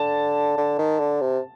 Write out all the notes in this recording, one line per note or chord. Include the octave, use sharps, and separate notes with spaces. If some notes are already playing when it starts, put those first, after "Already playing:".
Already playing: D3 A5
D3
D#3
D3
C3